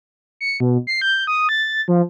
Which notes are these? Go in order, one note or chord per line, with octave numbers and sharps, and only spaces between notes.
C#7
B2
C7
G6
D#6
A6
F3